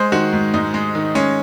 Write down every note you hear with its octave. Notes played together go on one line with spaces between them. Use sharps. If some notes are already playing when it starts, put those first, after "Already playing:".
Already playing: G#3 C5
D#3 F#4
G#2
G#2 D#4
G#3
D#3
G#3 C#4